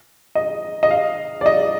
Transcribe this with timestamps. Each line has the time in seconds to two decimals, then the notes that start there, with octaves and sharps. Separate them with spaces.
0.35 D#5
0.83 D#5
0.91 F5
1.41 D5
1.46 D#5